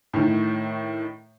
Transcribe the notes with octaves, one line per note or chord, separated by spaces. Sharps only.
A2 D#3